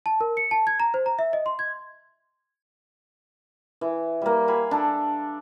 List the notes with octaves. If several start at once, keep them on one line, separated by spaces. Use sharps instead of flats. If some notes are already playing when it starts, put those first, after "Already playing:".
A5
A#4
C#7
A5
G#6
A#5
C5
A#5
E5
D#5
C6
G#6
E3
G3 A#3
F5 G#5 B5
D4 A4